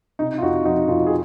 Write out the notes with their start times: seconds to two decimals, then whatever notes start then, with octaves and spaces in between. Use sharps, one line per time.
0.19 C3 D#4
0.38 F4
0.42 F2 D#4 F#4
0.65 F3 D#4 F#4
0.88 F2 F4
1.07 G#4